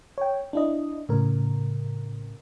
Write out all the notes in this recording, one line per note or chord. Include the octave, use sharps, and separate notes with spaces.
C#5 G5
D4 E4 D#5
A2 C#3 A#4